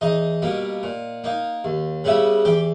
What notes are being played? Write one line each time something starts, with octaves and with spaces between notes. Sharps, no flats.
E2 D#4 D#5
B2 G3 A#3
A#2
A#3 D#4
D#2
C#3 G3 B3 E4
E2 G4 G5